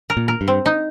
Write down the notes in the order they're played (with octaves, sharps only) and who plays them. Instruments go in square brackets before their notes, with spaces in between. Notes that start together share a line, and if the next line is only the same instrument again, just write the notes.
[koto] A#4
[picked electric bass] A#2
[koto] A#4
[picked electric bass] G2
[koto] C4
D#4